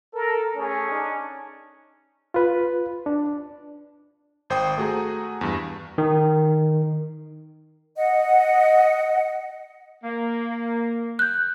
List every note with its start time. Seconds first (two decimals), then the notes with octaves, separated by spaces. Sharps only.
0.15 A4 A#4
0.56 A3 C#4 G#4
0.90 D4 D#4
2.34 F4 B4
3.06 D4
4.50 G#1 C5 G5 D#6 C7
4.78 A3 F#4 G#4 A#5
5.41 E2 G2
5.98 D#3
7.97 D#5 F#5
10.03 A#3
11.19 F#6 G6